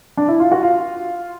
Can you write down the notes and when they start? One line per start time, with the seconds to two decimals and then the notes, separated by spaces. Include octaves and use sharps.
0.17 D4
0.28 E4
0.40 F4
0.51 F#4
0.63 F4